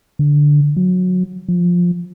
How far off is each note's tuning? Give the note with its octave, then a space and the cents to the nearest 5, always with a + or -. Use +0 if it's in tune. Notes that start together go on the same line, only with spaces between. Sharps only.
D3 +0
F#3 -20
F3 +10